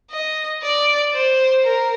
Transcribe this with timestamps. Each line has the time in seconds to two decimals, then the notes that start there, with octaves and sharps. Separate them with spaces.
0.11 D#5
0.63 D5
1.14 C5
1.65 A#4